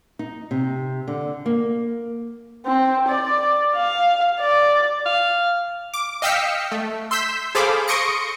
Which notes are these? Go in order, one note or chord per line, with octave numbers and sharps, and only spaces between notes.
D#4
C3
D3
A#3
C4
D5
F5
D5
F5
D6
D#5 F5 G5 E6 B6 C#7
A3
C6 E6 G6 B6
G#4 A4 C5 F5 B5 D6
C6 C#6 D#6 A#6 C#7 D7